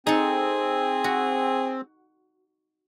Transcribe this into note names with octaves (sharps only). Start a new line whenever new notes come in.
C4 D#4 G#4 A4
F#4